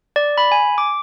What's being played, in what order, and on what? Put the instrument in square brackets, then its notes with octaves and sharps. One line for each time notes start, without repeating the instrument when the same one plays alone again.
[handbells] D5
B5
G#5
D6